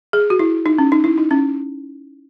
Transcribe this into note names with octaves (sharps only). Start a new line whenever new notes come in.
G#4
F#4
E4
D#4
C#4
D#4
E4
D#4
C#4